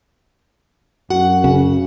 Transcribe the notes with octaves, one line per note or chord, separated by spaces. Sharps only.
F#2 F#4 F#5
C#3